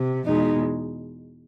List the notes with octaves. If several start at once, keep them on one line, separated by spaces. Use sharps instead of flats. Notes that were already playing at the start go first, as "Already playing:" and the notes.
Already playing: C3
E2 B2 G#3 D#4